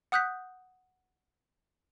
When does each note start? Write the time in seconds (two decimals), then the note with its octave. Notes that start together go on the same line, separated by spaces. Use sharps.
0.12 F#5 D#6 F#6 G6 B6